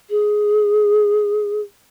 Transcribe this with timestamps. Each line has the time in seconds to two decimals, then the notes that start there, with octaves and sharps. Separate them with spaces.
0.10 G#4